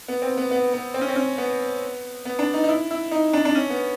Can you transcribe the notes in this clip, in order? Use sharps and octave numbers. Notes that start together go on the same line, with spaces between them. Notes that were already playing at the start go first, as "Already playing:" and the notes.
B3
C4
B3
B3
B3
C4
C#4
C4
C#4
B3
B3
D4
D#4
D#4
E4
E4
D#4
D4
D4
C#4
B3